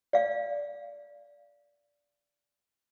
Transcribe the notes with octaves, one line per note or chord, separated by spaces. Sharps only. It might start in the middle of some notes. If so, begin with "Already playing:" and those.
D5 F5